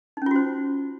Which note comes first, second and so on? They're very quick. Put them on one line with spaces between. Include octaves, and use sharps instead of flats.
D#4 C#4 F4 F#4 C5